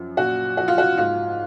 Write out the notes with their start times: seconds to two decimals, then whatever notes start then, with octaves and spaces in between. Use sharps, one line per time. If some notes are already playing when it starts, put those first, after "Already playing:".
Already playing: F#2 F3
0.17 A#2 F#4
0.57 F3 F#4
0.68 F4
0.78 F#4
0.98 G#2 F4